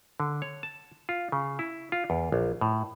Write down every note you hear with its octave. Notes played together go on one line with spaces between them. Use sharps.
D3
C#5
A5
F4
C#3
E4
F4
E2
A#1
A2